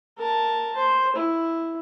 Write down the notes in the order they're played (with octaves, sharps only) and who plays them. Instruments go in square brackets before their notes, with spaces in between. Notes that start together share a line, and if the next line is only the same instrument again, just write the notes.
[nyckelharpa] A#4 A5
C5
E4